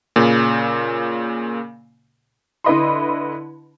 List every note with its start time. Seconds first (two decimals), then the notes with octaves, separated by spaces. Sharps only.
0.16 A#2 C#3
2.64 D3 E4 B4 D#5 B5 C6